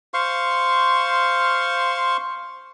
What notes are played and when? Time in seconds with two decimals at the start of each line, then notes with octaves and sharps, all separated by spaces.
0.14 C5 F5 C6 C#6